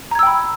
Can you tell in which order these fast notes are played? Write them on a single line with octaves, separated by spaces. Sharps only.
A#5 G#6 E6 G5 B5